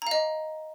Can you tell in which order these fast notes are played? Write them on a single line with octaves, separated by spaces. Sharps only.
A#5 F5 D#5